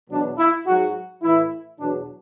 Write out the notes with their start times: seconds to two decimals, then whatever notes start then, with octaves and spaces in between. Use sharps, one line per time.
0.10 E2 B2 F#3 D4
0.38 E4
0.66 G#2 F#3 F#4
1.22 A2 E3 E4
1.79 E2 B2 F#3 D4